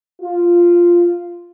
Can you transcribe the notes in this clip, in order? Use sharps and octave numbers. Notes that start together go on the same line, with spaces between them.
F4